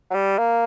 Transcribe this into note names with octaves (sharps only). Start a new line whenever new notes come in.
F#3
G3
A#3